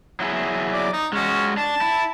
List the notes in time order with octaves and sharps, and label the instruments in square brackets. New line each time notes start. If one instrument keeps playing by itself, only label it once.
[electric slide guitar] F#3 E4 G#4
[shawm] D5
D#4
[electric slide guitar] G#3 F#4 [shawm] C#4
[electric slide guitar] D4 [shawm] A5
[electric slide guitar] E4